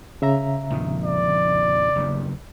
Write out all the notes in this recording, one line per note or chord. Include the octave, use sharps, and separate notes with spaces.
C#3 E5 A#5
A#1 F2 D#3
D5
F#1 E2 G2